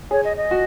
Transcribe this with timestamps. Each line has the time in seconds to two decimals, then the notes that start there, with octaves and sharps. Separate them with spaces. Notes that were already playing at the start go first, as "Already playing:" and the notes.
0.11 G#4 C#5
0.24 D#5
0.37 D#5
0.51 F#4